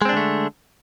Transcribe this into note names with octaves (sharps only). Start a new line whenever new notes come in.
D3 G#3 A3 C4 D4